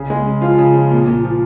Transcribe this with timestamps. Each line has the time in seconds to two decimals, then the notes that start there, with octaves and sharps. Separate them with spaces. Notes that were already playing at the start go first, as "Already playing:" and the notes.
Already playing: C#3
0.10 G#3
0.26 C#3
0.42 F3 F4
0.58 C#3
0.75 F3
0.91 A#2
1.07 A#2
1.24 F3